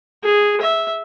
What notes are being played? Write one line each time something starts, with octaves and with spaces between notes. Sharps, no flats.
G#4
E5